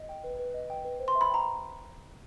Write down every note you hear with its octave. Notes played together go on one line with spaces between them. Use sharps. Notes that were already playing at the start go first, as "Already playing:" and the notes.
Already playing: D#5
G5
B4
B4
D#5
G5
B4
C5
C6
E5
B5
G5 A#5